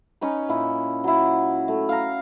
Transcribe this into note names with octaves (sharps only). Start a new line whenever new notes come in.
C#4 D#4 B4
A#2 E4
F#3 E4
A3
F5 A#5